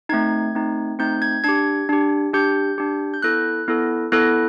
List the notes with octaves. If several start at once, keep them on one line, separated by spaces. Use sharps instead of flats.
A3 C4 D#4 G#6
A3 C4 D#4
A3 C4 D#4 G6
G#6
D4 G4 G#6
D4 G4
D4 G4 G6
D4 G4
G6
B3 E4 A4 F#6
B3 E4 A4
B3 E4 A4 F#6